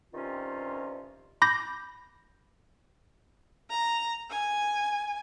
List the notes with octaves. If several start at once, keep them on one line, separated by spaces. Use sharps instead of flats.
G2 C3 D#3 C#4 F4
B5 D6 G6 A#6
A#5
G#5